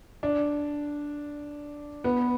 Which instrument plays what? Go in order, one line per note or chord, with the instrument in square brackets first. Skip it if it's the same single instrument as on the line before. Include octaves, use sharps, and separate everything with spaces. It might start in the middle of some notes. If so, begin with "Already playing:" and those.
[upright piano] D4
B3